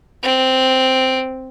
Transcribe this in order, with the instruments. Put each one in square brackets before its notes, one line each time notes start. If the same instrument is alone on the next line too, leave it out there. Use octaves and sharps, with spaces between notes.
[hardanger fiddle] C4